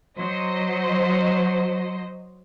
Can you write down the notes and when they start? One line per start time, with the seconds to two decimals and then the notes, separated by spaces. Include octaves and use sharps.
0.18 F#3 C5 D#5